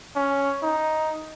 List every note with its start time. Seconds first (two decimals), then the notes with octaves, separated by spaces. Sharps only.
0.16 C#4
0.63 D#4